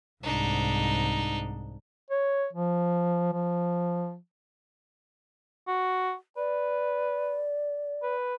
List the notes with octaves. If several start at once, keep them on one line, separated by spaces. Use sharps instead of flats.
C2 G#2 D4 D#4
C#5
F3
F3
F#4
B4 D5
B4